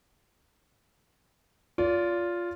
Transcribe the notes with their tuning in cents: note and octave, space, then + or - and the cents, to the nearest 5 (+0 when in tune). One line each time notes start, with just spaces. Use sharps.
F4 +0 D5 -35